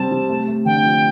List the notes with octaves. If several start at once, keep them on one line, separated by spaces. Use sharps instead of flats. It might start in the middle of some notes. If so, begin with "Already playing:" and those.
Already playing: C3 G3 C4 A5
C3
A3
A3
D3 G5
F3